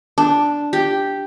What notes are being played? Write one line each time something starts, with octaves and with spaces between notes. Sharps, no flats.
D4
G4